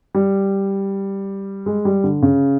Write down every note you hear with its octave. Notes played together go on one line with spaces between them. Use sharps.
G3
G#3
G3
D3
C#3